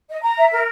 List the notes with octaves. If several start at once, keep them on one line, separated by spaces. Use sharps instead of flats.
D#5
A#5
E5
A#4